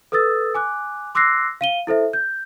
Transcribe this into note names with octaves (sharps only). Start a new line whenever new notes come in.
A4 B4 D#6 E6 A6
G#5 D6 F#6
C6 D6 E6 F#6 A#6 C7
F5 D#7 G7
E4 A4 C5 E5
G6